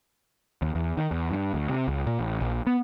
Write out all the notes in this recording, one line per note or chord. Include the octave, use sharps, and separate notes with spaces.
D#2
E2
D#3
E2
G2
D2
C3
C#2
A#2
A1
A#1
B3